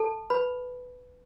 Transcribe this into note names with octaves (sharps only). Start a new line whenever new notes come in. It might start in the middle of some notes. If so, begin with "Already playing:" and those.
Already playing: A4 A5
B4 B5